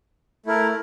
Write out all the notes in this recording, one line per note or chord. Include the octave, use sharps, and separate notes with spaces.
A3 E4 A#4